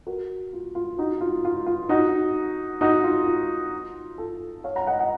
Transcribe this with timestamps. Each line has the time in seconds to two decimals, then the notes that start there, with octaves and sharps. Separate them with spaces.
0.07 F#4 A#4
0.53 F4
0.75 F4
0.98 D#4 F#4
1.21 F4
1.45 F4
1.66 F4
1.89 D#4 F#4
2.81 D#4 F#4
3.04 F4
3.27 F4
4.18 F4 A4
4.64 C#5 F5
4.76 F#5 A#5
4.87 D#5 F#5
4.99 D#5 F#5